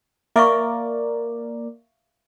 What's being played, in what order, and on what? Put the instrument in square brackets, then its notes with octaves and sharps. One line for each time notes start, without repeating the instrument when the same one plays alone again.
[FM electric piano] A#3 A#4 D5 [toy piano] E5 F5 C#6